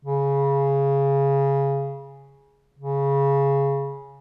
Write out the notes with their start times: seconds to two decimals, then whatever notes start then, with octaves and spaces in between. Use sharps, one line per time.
0.05 C#3
2.79 C#3